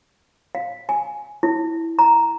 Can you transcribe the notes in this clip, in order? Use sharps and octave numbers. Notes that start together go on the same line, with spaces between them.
F5
G#5
E4
A#5